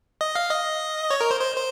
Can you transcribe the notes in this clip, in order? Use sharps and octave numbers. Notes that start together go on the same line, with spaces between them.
D#5
F5
D#5
C#5
A#4
C5
C5
C5